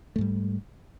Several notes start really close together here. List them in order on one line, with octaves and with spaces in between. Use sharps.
A3 G#2 G3